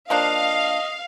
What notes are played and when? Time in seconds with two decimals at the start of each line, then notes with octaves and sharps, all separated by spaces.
0.10 F3 A#3 D4 D#5 F5